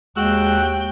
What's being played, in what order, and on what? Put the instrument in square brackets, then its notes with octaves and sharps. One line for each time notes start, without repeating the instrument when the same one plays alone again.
[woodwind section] D#2 [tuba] G#3 [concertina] F#4 E6 F#6 [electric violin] G5